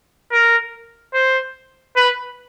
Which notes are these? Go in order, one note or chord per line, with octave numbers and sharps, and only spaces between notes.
A#4
C5
B4